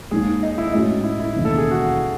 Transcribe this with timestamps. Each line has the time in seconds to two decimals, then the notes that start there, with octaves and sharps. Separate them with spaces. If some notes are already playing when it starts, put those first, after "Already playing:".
0.11 D#2 D#3 G#3 G#4
0.43 D#4
0.58 E4
0.73 A2 G#3 C#4 D#4 F#4
1.04 E4
1.20 E4
1.34 E1 D#2 C#3 E3
1.45 A4
1.58 G#4
1.71 F#4